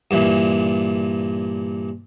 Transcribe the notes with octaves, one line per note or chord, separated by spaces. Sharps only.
G2 A#2 E3